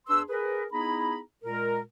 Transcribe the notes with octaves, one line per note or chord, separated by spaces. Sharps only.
E2 D4 G#4 B4 C6 E6
G#4 A#4 B4
B3 D#4 E4 G#4 A#5 B5
A#2 G#3 A#4